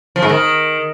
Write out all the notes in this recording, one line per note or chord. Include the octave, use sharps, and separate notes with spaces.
F3
G#2
D#3